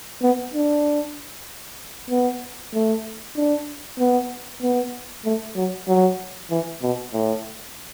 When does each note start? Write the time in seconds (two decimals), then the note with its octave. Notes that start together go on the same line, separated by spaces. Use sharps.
0.22 B3
0.54 D4
2.10 B3
2.74 A3
3.36 D4
3.99 B3
4.62 B3
5.25 A3
5.56 F#3
5.88 F#3
6.50 E3
6.82 B2
7.13 A2